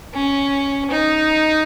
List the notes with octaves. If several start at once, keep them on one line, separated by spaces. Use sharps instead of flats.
C#4
D#4